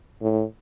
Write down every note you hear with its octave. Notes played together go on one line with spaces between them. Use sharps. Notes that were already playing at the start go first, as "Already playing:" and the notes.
A2